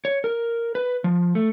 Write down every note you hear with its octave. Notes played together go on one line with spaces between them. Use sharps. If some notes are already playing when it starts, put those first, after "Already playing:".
C#5
A#4
B4
F3
A3